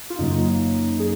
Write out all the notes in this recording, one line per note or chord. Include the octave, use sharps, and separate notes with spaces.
F4
F#2 C#3 F#3 A#3 D#4
G#4